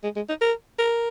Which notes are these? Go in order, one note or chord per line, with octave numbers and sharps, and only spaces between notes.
G#3
G#3
D#4
A#4
A#4